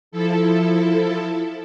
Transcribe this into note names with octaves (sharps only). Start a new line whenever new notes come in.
F3 E4 A4